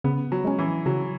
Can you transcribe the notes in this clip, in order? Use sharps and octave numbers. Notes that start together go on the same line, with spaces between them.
C#3 B3
F#3
G#3 C#4
E3
C#3 F#3